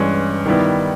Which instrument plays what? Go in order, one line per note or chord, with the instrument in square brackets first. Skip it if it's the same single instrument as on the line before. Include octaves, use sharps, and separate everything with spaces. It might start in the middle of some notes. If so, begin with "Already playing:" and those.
Already playing: [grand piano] G2 E3 G#3 C#4
D#3 G3 B3 E4